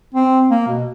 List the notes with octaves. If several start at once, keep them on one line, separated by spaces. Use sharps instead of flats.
C4
A#3
B2